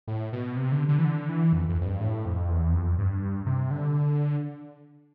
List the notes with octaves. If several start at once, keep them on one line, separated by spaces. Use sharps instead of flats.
A2
B2
C3
D3
D3
E3
D3
E3
F2
F2
F2
G2
A2
F2
E2
F2
G2
C3
D3